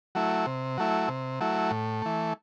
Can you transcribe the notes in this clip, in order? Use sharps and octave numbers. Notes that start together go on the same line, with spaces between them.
F#3 A3 E4
C3
F#3 A3 E4
C3
F#3 A3 E4
A2
E3 A3